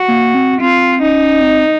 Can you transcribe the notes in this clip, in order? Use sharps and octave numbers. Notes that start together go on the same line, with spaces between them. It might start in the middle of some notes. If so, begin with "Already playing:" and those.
Already playing: F#4
A#3
C4
C4 F4
C#4 D#4
C4